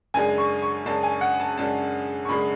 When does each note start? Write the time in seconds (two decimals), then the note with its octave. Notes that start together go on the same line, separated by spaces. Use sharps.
0.14 F#2 C#3 G#3 D4 G#5
0.38 C#6
0.62 C#6
0.86 F#2 C#3 G#3 D4 A5
1.03 G#5
1.21 F#5
1.40 A5
1.57 F#2 C#3 G#3 D4 A5
2.25 C#6
2.28 F#2 C#3 G#3 D4 B5